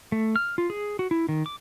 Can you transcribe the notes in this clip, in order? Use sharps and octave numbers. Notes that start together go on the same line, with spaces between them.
A3
F6
F4
G#4
F#4
E4
D#3
D6